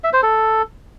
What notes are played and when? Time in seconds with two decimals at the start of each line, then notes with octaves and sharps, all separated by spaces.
0.04 E5
0.13 C5
0.23 A4